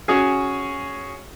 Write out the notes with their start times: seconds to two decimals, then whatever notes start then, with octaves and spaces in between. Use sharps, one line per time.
0.08 C#4 F#4 G#4